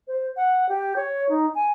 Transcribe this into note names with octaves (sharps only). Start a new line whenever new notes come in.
C5
F#5
G4
C#5
D#4
G#5